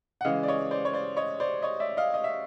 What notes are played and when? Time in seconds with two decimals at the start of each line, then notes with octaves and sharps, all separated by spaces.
0.21 F#5
0.25 C#3 E3 G#3 D#5 F5
0.43 D5
0.48 C#5 D#5
0.71 C5 D5
0.85 C#5
0.93 C5 D5
1.17 C#5 D#5
1.40 C5 D5
1.62 C#5 D#5
1.80 D5 E5
1.97 D#5 F5
2.14 D#5
2.24 E5